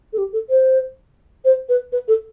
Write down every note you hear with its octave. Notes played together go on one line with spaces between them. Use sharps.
A4
G4
A4
C5
C5
B4
B4
A4